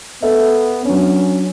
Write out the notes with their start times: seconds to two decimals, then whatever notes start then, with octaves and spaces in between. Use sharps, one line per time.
0.22 B3 A4 E5
0.85 F#3 C#4 D4